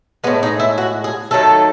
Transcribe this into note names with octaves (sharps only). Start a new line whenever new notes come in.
A2 G#3 B3
D#4
E4
F#4
G#4
D#3 F#3 A3 A4